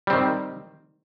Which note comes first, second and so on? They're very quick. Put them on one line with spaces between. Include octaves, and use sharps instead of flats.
G3 C4 D#3